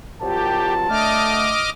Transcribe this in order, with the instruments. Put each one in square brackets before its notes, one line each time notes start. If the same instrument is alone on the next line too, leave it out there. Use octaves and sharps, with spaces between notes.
[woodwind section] C2 F#3 F4 [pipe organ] G4 [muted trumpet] A5
[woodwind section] D3 A3 [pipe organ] D#5 D6 F6